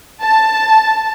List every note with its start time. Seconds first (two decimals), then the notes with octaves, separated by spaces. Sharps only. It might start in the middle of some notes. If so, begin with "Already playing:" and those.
0.22 A5